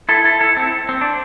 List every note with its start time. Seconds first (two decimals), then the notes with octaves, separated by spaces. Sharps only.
0.09 E4 A4
0.24 E4 A4
0.41 E4 A4
0.57 C4 E4
0.89 C4
1.01 D4